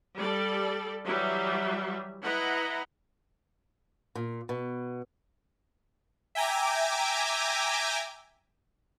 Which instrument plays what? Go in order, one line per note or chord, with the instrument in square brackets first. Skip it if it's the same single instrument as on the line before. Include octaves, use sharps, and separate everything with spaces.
[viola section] G3 A4 D5
E3 F#3 G3 E5
E4 B4 D#5 F#5 A#5
[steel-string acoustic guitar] A#2
B2
[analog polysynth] E5 G5 G#5 A#5 D6